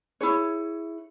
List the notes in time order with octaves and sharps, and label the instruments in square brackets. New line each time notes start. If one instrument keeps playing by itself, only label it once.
[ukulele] E4 G#4 C#5